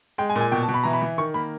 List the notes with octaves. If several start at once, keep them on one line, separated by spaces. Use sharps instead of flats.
G#3 G5
G#5
A#2
G#5
B2 G5
A5
B2
B5
E3 A#5
B5
E3
D#3 C#6
A#3 B5